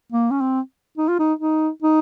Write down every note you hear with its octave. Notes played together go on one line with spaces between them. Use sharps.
A#3
C#4
C4
D#4
F4
D#4
D#4
D#4